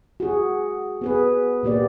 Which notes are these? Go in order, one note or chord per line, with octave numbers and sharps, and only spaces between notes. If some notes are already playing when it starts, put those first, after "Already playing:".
F#4 G#4
B3 G#4 B4
A#2 A#3 G4 D5